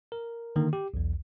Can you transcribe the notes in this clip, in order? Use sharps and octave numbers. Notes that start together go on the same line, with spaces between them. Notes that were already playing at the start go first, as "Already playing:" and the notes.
A#4
D3 D#3 A#3
G4
B1 E2